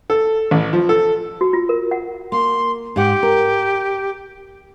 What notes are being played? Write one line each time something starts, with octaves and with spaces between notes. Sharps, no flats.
A4
A1
F3
A4
F#4
F4
A#4
F#5
A#3 C6
G#2 G4 F#5
A#4